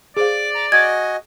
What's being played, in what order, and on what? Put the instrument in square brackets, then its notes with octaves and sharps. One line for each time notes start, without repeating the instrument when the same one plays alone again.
[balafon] G#4 C5 F5 [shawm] D5 [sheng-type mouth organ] D6
[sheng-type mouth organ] A#5
[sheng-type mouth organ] F#4 D#5 G#5 [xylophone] G#6